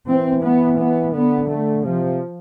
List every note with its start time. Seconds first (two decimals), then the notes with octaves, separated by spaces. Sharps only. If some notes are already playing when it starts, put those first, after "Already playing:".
0.08 E3 C4
0.45 B3
0.80 B3
1.15 D3 B3
1.50 A3
1.85 C3 F3